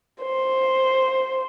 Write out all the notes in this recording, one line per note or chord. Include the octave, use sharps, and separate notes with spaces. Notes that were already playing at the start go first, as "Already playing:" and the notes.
C5